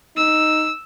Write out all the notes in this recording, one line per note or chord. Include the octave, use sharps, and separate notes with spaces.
D#4 E6